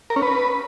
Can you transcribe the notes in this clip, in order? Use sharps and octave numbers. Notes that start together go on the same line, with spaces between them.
A#4
C#4
B4